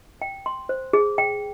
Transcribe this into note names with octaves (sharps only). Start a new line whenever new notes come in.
G5
C6
C5
G#4
G5